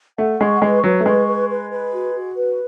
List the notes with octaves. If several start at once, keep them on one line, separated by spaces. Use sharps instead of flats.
A3 F#5
G#3 C#6
G#3 B4
F#3 B4
A3
G#3 C#6
B4
B4
B4
F#4
F#4
B4